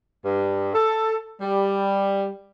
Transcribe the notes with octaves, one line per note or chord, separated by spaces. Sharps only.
G2
A4
G3